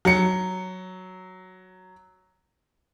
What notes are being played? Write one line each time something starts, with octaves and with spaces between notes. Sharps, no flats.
F#3 C#7